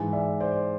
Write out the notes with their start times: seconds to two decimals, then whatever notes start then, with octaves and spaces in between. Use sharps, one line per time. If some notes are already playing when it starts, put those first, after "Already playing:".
Already playing: G#2 E3
0.13 D5 E5
0.40 C5 D5